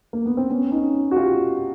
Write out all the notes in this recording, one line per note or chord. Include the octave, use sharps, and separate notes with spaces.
A#3
B3
C4
B3 C#4
C#4 D#4
F#4
F4 G4